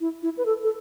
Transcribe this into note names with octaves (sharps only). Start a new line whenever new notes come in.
E4
E4
B4
A4
A4